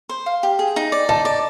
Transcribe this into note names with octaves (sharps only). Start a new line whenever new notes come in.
C5
F5
G4
G#4
D#4
D5
D#4 A5
D5